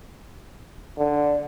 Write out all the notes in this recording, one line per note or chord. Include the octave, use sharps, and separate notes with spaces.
D3